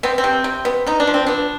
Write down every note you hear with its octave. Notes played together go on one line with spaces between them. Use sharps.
B3 C4
C4
C3
C3
B3
B3 D#4
D4
F3
C4
B3 D4